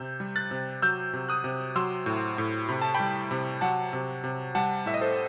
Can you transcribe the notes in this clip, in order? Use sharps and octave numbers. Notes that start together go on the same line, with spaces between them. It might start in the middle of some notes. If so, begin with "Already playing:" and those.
Already playing: C3 E6 G6
G3
F#6 A6
C3
F#3 E6 G6
C3
D#6 F#6
C3
F#3 C6 E6
A2
A2
C3 B5
A5
G5 B5
G3
C3
F#3 F#5 A5
C3
C3
G3 F#5 A5
A2 E5
D#5
A4 C5